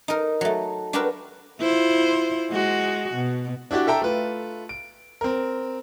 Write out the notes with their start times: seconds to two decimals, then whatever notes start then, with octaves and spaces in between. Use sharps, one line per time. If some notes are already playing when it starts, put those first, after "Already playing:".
0.08 D#4 A#4
0.41 F#3 A3
0.93 D4 F#4 G4 A#4 B4
1.61 E4 F4 C5
2.50 G#3 F#4
3.15 B2
3.71 D4 E4 F#4 G4 D5
3.87 A4 E5 G5 A#5
4.02 A3 F4 B4
4.69 D7
5.21 C4 A#4